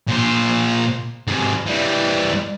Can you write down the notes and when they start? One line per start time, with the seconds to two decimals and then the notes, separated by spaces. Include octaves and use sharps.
0.08 A#2 C5
1.27 G#2 C3
1.66 E3 G3